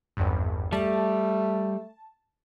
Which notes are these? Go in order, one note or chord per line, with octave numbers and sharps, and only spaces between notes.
G#1 E2 G2
G3 A3 A5